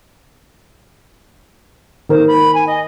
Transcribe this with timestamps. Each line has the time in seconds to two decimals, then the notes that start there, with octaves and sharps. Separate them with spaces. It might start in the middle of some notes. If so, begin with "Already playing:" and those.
2.09 D#3 A#4 C5
2.27 B5
2.54 G#5
2.66 D#5